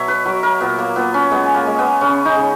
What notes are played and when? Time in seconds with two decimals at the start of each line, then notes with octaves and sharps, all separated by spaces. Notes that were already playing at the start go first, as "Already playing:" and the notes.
Already playing: B2 F#3 C#5 E5
0.08 B4
0.25 F#3 A#4
0.43 A#4
0.60 A#2 B3
0.79 A#3
0.96 A#2 B3
1.14 C#4
1.31 G#3 B3
1.54 A#3
1.66 G#3
1.79 B3
2.01 C#3 C#4
2.25 D#4
2.36 C#3